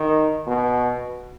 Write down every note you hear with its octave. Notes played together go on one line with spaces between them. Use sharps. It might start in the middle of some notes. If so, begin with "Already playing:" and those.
Already playing: D#3
B2